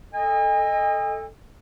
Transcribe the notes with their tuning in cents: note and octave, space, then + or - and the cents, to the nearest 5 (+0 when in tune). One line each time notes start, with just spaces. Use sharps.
A4 +0 D#5 +0 G#5 -45